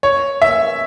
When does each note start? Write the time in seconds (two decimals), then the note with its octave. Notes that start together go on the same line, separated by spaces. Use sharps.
0.03 C#5
0.42 E5